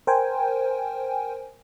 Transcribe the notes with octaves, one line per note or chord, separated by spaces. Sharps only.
A#4 C5 G5 G#5